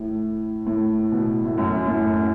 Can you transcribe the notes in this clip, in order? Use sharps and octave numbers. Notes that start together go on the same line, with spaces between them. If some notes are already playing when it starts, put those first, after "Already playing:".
Already playing: A2
A2
B2
A2
F#2
F#2
A2